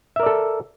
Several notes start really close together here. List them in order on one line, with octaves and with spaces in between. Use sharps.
E5 A#4 D5 A4